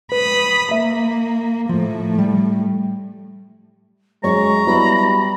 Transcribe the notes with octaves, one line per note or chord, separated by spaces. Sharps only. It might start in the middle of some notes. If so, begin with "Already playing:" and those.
B4 B5 D#6
A#3 E5
A2 F3
G3
F#2 G#3 C#5 A#5 C#6
F#3 G3 B3 E4 B5